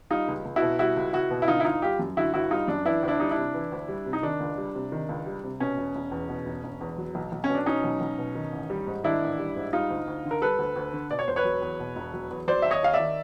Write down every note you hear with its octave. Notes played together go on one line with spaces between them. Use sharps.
G3 D#4 F4
C#2
C#2
E4 F#4
B2
G3 E4 F#4
C#2
C#2 E4 F#4
B2
E4
D3 D#4 F4
E4
G1 D#4 F4
G3 F4 G4
F#2
D3 E4 F#4
G1 E4 F#4
G3 D#4 F4
F#2 D4
E3 D4 E4
D2
D4 E4
G3 D#4
D4 E4
C3
E3
D2
G3
C3
D#4
D#3 D4
C#2
G3
C3
D#3
C#2
G3
C3
B2 C#4
E1
E1
E2
B2
E1
E1
E2
F#3
B1
B1
C#4
B2
D4
F#3 C#4 D#4
B1
B1
B2
D#3
A1
G3
G#2
D#3 D4 E4
A1
G3
G#2
G3 D#4 F4
D2
D2
D3
A#4
G3 A4 B4
D2
D2
D3
B2 D5
C#5
E1 C5
B4 C#5
F#3
E2
B2
E1
F#3
E2
F#3 C5 D5
D#2 E5
C#5 D#5
D#2 F5
D5 E5
D#3